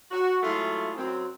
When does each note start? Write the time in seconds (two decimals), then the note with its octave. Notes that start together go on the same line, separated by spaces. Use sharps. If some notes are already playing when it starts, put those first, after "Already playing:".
0.11 F#4
0.43 F#3 G#3 A3 E4 F4 G#4
0.97 F#2 C4